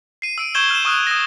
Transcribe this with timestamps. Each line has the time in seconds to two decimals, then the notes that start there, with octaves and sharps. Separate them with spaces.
0.22 C7 D#7
0.38 E6 D7 D#7
0.55 C#6 E6 G6 G#6 E7 G7
0.70 F6 E7
0.85 C#6 D#6 F6 F#6
1.07 D#6 A#6